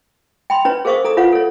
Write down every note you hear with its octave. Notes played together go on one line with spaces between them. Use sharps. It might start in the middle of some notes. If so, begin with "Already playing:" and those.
G5 B5 C6
C#4 B4 C#5 A#5
G#4 A#4 C5 F5 C#6 D#6
A4 A#5 D#6
F4 B4 C#5 F5 F#5
A4 C#5